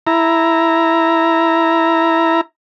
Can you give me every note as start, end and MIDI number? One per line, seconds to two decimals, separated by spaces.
0.07 2.41 64
0.07 2.41 82